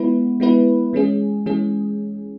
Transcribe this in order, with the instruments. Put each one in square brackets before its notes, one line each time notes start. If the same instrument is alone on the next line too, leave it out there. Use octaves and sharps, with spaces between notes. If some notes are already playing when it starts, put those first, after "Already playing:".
Already playing: [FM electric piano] G#3 B3 E4 B4
G#3 B3 E4 B4
E3 G#3 C#4 G#4
E3 G#3 C#4 G#4